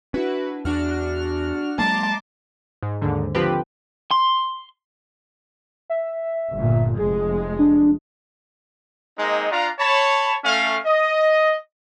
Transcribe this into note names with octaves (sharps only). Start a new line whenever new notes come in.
C#4 D4 E4 F#4 B4
E2 D4 F#4 F6
F#3 G#3 A#3 A5 A#5 C6 D6
G#2
D#2 G#2 D3
D3 F3 C4 G4 B4
C6
E5
G1 A#2
F1 G#3 G#4
D4
G#3 A#3 C4 D#4
D4 F4 D5 F5 F#5 A#5
C#5 A5 B5
A3 C#4 F5
D#5